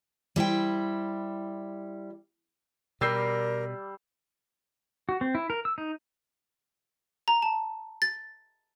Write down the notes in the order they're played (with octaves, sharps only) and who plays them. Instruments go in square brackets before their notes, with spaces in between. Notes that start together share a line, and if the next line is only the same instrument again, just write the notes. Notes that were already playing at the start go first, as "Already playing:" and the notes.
[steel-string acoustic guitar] G3 E4 C5 G5
[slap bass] B2 [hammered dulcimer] G3 D5 [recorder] A#4 [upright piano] E6 G6 C7
[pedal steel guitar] F#4
C4
E4
A#4
E6
D#4
[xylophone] A#5
A5
A6